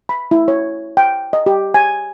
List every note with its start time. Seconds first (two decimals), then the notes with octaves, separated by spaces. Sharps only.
0.09 B5
0.31 E4
0.48 C#5
0.97 G5
1.33 D#5
1.46 G4
1.74 G#5